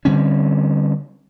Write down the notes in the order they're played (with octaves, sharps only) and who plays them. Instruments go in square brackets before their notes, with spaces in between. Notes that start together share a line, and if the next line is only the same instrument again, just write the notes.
[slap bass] D3 G3 C4 C#4